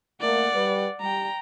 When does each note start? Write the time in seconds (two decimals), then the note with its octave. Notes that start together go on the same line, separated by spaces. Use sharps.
0.21 A3 A#3 D5 F#5
0.55 G3 B4
1.01 G3 G5 A#5